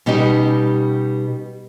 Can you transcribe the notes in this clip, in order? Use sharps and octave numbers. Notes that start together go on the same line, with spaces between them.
B2 G3 C#4 D#4 G4